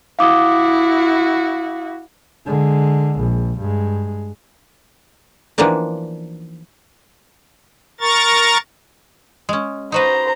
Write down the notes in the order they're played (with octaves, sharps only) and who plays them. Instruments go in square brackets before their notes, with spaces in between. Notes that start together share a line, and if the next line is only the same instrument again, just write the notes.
[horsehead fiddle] E4 F#4 [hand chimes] F5 D6 D#6
[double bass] D3 G#3
A#1
G2 G#3
[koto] E3 F3 A#3 B3 D4 D#4
[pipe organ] A#4 A#5 C#6 A6
[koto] G#3 C#4
[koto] D#4 F#4 B4 [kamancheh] C5 A#5